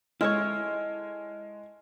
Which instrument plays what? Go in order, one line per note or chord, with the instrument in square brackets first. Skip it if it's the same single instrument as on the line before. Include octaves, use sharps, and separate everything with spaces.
[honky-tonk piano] G#3 [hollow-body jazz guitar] E4 A4 C#5 [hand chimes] F6